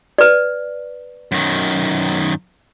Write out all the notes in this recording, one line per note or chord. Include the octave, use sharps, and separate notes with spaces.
B4 D5
F#2 D#3